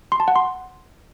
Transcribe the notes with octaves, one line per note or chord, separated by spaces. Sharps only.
C6
A5
F#5
C6